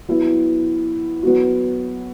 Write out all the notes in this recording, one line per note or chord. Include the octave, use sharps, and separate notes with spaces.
F#3 B3 E4
F#3 B3 F#4